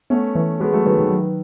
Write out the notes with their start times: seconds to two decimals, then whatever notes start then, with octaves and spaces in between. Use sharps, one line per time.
0.10 A3 B3 C#4
0.35 E3
0.60 G#3 B3 F#4
0.73 F#3 A3
0.86 D#3 F#3 B4
0.98 D#3
1.11 F#3